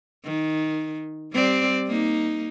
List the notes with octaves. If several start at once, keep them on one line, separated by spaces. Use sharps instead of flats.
D#3
G3 C4 D5
A#3 D#4